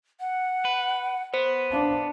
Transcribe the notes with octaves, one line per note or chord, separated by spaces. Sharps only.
F#5
B4
B3 C5
D4 F5